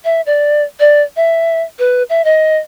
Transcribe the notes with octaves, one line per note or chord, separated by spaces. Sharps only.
E5
D5
D5
E5
B4
E5
D#5